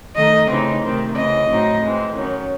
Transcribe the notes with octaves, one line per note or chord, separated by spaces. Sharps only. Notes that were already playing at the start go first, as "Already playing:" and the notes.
D#3 A3 D#4 D#5
C#3 E3 A3 C4 D#4
C3 D#3 A3 C4
C#3 E3 C4 D#5
A2 F#3 C4 D#4
E3 G#3 C4
D#3 F#3 C#4